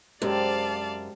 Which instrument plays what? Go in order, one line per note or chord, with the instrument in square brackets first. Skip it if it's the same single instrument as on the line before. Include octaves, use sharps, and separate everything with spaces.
[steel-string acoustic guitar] F#2 [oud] C3 C5 [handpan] G#3 G4 [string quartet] D5 F5 A5